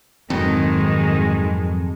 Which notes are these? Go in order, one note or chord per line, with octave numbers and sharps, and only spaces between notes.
F1 F2 G#2 D#3 F#3 G#3 C4